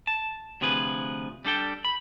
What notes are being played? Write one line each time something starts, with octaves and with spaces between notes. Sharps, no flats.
A5
D2 C3 F3 G#4 B4
G3 D4 A4 G5
B5